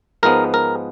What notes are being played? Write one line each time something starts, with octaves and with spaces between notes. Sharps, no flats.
G#2 F3 G#3 B3 A#4
A#4